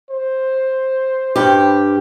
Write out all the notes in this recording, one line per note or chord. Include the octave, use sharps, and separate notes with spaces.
C5
G2 G4